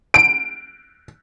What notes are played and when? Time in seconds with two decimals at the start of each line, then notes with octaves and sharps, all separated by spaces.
0.14 D7